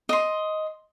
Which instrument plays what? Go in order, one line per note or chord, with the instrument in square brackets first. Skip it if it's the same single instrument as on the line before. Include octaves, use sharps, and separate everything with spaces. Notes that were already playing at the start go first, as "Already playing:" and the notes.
[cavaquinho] D#5 C6